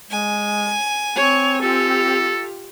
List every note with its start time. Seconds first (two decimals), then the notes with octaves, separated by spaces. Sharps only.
0.11 G#3 G#5
1.16 C4 C#5
1.61 F4 G4 A4